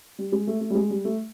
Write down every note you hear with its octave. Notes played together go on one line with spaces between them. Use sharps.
G3
G#3
A3
A3
G3
G#3
G3
A3